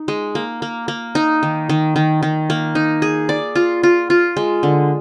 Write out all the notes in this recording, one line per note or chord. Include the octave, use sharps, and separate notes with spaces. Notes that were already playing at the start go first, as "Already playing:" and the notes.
Already playing: D#4
G#3
A#3
A#3
A#3
D#4
D#3
D#3
D#3
D#3
A#3
D#4
G#4
D5
F4
F4
F4
G#3
D3